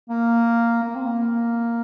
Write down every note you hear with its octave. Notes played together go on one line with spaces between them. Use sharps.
A#3
A#3
C4
A#3